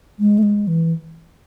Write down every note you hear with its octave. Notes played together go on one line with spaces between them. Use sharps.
G#3
A3
G#3
E3